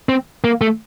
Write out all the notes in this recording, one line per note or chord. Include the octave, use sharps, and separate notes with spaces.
C4
A#3
A3